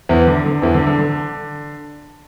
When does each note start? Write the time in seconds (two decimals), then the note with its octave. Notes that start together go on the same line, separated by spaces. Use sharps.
0.09 E2 E3
0.27 D3
0.46 D3
0.62 E2 E3
0.74 D3
0.87 D3
0.99 D3